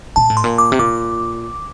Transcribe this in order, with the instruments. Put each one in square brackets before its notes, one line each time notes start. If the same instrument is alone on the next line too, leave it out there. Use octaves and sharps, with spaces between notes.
[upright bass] A#2 [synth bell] A5
[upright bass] A2
[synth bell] C6
[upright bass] A#2
[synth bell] D6
[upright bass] C3
[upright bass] A#2 [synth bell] D6